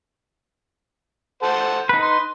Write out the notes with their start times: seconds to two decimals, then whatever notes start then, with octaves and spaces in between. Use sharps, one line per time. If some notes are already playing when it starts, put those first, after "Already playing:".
1.43 A4 C5 F#5
1.89 D#4 B4
2.02 C6